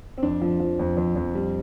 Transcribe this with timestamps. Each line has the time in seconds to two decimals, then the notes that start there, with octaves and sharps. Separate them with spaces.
0.18 C4
0.23 F2 D4
0.41 F3
0.60 F3
0.79 F2
0.97 F2
1.16 F2
1.35 G3